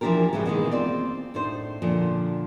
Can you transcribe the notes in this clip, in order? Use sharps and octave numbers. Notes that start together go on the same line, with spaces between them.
E3 F3 A3 D4 G4 A#4
A2 C#3 E3 G#3
B2 D#3 E3 F#3 G#3 A#3
C4 F4 D5
A2 D4 D#4 C5
A#2 D3 F3